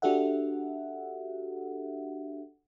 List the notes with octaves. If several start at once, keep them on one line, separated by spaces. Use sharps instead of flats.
D4 F#4 G4 A4 E5 F#5